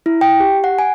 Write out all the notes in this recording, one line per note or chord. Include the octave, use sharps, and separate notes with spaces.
E4
G5
G4
F#5
G#5